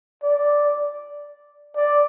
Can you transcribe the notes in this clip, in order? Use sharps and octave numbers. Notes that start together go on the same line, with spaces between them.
D5
D5